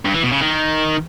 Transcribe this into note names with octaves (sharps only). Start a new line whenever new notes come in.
G2
E3
B2
C#3
D#3